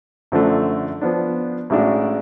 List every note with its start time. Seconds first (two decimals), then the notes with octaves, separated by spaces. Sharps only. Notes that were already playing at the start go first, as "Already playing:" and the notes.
0.32 F#2 D3 F3 A3 D4
1.01 F3 B3 D4
1.70 A1 A2 G#3 D4 F#4